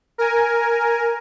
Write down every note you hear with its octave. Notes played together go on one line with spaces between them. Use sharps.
A#4 G#5